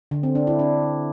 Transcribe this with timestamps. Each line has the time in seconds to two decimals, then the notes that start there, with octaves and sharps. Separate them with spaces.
0.11 D3
0.23 C4
0.35 D4
0.47 E4
0.59 D4